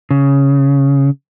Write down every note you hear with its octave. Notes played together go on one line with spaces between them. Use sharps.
C#3